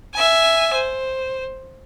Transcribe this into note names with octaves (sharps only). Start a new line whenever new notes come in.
E5 G#5
C5